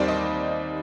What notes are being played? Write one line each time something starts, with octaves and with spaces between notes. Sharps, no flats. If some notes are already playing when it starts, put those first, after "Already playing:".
Already playing: D#2 D#3 G3 C4 C5 D5
D#5